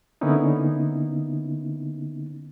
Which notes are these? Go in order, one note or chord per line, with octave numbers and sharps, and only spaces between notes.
D3 A#3 B3 C#4 D#4 E4